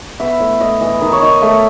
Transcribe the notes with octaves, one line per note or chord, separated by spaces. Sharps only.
B3 E5
A2
A2 D#5
E3 D#5
D#3 D#5
C#5
D#3 D#5
A3 E5